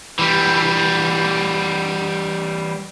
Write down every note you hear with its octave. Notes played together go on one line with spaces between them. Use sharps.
E3 G3